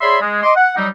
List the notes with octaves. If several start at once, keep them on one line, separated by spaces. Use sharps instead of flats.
G#4 C#5 D5 E5 B5 C6
G#3
D#5 C6 D6
F#5
F#3 G3 D#4